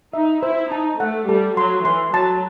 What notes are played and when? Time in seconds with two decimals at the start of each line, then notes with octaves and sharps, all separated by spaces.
0.13 D#4 E5
0.43 E4 C5
0.71 D#4 A5
0.99 A3 F#5
1.28 G3 A4
1.57 F#3 C6
1.85 E3 C6
2.13 F#3 A5